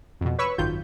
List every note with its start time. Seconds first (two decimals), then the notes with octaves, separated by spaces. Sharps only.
0.21 F2 B2
0.38 B4 C#5 B5 C#6 E6
0.58 G#1 F#2 D#3 F4 G6